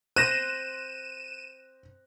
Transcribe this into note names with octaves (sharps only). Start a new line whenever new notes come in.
C5 F#6 G6 A#6 D#7 E7